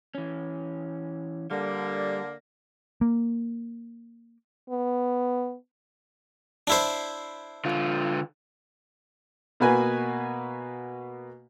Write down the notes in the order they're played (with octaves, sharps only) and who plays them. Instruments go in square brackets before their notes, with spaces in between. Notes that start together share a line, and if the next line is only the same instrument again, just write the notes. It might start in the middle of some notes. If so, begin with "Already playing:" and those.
[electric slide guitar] E3 C#4
[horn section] D3 A#3 D5 [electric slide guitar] G3
[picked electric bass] A#3
[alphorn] B3
[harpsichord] D4 E4 C5
[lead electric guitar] D3 F4
[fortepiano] B2 A#3 B3 F#4 B4 G#5